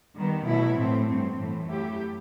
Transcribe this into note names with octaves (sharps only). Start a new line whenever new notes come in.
D#3 G3 B3
B2 F#3 A3 E4
A2 E3 A3 C4
G2 F#3 C4
A2 E3 A3
F#2 F#3 A3 E4 G4